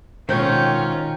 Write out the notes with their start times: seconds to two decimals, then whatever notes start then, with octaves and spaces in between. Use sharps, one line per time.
0.29 B2 D#3 G#3 C4 C#4 F4 G5 C#6